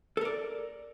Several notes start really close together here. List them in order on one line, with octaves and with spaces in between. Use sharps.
A4 A#4 D5